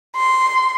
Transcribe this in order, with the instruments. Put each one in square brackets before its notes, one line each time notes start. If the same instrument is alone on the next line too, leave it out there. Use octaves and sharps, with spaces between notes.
[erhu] C6